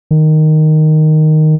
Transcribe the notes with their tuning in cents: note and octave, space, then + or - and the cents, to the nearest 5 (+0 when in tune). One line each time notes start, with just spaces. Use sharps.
D#3 -5